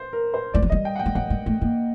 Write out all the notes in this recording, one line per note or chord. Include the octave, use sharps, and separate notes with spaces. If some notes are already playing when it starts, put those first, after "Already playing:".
Already playing: C5
A#4
C5
G3 D5
F#3
G3 D#5
G5
F#5
G5
G3
F#3 F#5
G3
A3
A#3